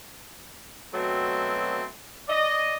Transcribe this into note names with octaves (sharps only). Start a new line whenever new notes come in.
B2 F#3 A3 C4
D5 D#5